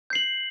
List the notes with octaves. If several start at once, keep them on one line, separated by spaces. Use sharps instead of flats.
G6 C7 F#7